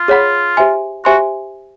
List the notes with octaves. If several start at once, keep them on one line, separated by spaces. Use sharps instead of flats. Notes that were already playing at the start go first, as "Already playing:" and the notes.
Already playing: F4
G#4 C#5 F#5 B5
G4 C5 E5 G#5 C6
F#4 G4 C5 E5 G#5 C6